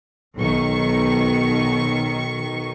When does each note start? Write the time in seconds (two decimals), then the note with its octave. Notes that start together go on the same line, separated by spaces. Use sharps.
0.36 B1 D#3 C#6